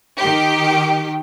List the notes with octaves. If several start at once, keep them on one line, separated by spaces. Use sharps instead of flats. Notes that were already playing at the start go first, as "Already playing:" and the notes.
D#3 G4